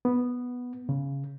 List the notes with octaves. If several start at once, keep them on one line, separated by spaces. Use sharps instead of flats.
B3
C#3